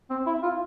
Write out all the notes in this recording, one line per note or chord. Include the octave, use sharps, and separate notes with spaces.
C4
E4
F4